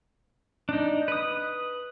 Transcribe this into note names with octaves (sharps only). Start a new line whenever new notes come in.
D4 D#4
B4 D#6